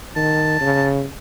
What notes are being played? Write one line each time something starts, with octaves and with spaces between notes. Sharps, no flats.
D#3 A5
C#3